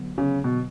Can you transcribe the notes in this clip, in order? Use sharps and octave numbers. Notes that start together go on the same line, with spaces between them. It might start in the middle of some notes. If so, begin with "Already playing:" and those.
Already playing: D3 F#3 B3
C#3
B2